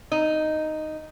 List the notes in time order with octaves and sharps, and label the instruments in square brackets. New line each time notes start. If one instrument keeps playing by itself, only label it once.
[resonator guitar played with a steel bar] D#4